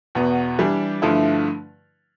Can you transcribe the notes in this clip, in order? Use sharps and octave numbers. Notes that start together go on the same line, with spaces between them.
E2 B2 B3
E3 G3 D4 G4
G2 D3 F3 A3 E4